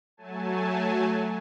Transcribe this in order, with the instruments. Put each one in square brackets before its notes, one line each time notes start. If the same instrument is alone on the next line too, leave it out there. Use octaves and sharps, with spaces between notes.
[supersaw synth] F#3 A3 G#5 A5